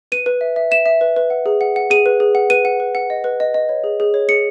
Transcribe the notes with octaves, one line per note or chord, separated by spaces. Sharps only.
B4 D#7
B4
E5
E5
E5 E7
E5
B4
B4
F#5
G#4
F#5
F#5
G#4 D#7
B4
G#4
F#5
B4 D#7
F#5
B4
F#5
D#5
B4
D#5
D#5
C#5
G#4
G#4
C#5
G#4 C#7